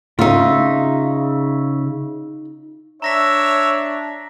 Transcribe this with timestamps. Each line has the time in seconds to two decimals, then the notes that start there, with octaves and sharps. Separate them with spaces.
0.19 C#3 D#4 F4 E5
3.02 D4 C#5 E5 A#5 A#6 B6